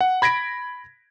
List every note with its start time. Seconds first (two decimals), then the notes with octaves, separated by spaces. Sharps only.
0.01 F#5
0.22 B5 G#6 A#6 B6 D7